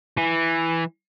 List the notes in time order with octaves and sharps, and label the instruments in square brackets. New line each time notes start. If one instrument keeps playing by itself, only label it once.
[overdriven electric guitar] E3